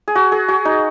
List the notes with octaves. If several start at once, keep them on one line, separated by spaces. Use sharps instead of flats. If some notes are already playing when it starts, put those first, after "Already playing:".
G#4
F#4
G#4
F#4
D#4